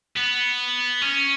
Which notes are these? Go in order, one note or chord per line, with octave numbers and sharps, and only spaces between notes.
B3
C#4